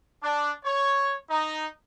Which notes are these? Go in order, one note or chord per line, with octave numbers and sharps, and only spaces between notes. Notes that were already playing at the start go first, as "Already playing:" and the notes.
D4
C#5
D#4